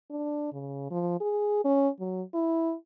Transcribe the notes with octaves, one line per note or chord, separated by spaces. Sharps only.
D4
C#3
F3
G#4
C#4
F#3
E4